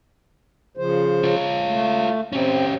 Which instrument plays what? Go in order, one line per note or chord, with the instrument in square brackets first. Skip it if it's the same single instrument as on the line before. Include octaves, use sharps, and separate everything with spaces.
[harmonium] C#3 F3 C5
[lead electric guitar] F4 C#5
[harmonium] A3
[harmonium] C4 [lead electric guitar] C#4 G4